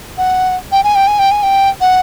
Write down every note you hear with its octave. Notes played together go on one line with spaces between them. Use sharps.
F#5
G5
G#5
G5
G#5
G5
G#5
G5
F#5